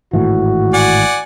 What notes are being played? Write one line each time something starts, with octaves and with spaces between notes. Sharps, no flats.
G#1 A2 E3 F#4
D5 F#5 G#5